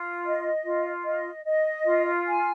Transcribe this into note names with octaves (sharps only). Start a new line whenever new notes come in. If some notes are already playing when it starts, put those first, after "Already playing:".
Already playing: F4
D#5
F4
D#5
D#5
F4
G#5